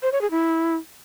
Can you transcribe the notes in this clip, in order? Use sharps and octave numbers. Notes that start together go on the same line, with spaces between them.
C5
C#5
G#4
E4